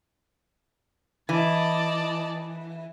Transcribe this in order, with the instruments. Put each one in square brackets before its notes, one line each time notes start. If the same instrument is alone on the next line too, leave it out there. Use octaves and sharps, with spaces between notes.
[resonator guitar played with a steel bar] E3 [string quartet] D5 D#5 A5